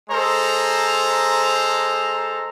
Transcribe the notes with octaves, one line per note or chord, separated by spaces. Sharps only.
G#3 A4 C5 A#5